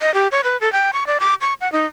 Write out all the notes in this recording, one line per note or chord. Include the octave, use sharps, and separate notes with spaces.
D#5
G4
C#5
B4
A4
G5
C#6
D5
D6
C#6
F#5
D#4